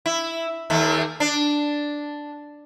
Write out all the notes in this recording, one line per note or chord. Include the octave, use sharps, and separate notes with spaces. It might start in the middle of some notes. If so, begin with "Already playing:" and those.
E4
D#2 A3
D4